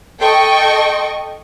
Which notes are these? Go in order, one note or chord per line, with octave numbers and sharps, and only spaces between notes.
A4 D#5 G5 C#6